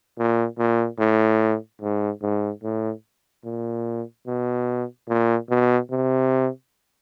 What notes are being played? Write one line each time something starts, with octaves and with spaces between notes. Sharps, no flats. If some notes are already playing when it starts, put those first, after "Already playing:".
A#2
A#2
A2
G#2
G#2
A2
A#2
B2
A#2
B2
C3